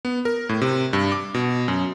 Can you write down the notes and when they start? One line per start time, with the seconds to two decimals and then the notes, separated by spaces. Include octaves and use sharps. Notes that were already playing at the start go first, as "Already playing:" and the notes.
0.05 B3
0.25 A#4
0.49 A2
0.62 C3
0.93 G2
1.12 D6
1.34 B2
1.68 F#2